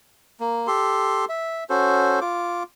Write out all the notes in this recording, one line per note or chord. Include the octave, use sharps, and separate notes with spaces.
A#3
G4 A4 C6
E5
C#4 F#4 A4 C5
F4 D6